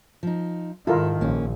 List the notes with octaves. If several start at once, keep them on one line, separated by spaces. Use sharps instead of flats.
F3 D#4
G#2 D#3 E4 F4 A4 A#4
A#1 A#3 C#4